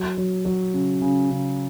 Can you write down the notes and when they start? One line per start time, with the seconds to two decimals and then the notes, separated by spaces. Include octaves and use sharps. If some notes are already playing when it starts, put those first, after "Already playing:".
Already playing: F#3
0.17 F#3
0.45 F#3
0.73 C#3
1.01 C#3
1.30 C#3